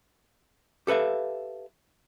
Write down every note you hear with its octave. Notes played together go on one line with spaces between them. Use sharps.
G4 A4 B4 E5 F5